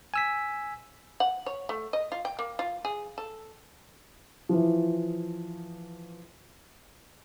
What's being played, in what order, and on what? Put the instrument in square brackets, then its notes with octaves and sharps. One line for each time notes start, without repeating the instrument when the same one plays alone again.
[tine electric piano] G#5 E6 B6
[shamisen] F#5
C#5
A3
D#5
F4
G5
A#3
F4
G#4
A4
[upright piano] E3 F3